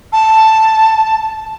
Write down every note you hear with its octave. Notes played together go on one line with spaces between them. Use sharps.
A5